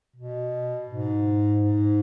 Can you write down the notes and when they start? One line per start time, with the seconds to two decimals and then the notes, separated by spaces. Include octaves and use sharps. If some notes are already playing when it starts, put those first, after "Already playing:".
0.16 B2
0.89 G#2
1.61 G#2